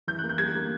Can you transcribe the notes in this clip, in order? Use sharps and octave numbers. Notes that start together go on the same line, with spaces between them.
E3 G6
A#3 F#6
G6
G3 G#6
A#3